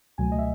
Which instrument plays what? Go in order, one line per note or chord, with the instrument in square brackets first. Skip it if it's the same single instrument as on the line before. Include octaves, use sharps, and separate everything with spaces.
[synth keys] C#2 B2 F#3 A3 G#5
D#5
E5